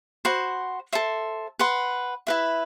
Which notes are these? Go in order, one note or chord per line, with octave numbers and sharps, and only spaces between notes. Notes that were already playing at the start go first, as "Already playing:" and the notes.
F#4 C5 F#5 B5
A4 C5 E5
B4 F#5 C6
E4 B4 E5